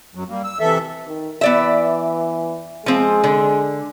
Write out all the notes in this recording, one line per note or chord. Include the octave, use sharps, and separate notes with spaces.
F#2 F#3
G3 A#3
E6
C3 E3 A4 E5
D#3
E3 B3 D5 E5
F3 G#3 C4
D3